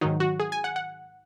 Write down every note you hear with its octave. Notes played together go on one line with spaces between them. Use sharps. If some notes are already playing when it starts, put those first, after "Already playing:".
G#2 D#3 F#3 D#4
F#4
G#4
G#5
F#5
F#5